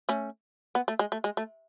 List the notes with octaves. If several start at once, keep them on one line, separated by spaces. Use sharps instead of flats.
A3 C#4
B3
A3
G#3
A3
G#3
A3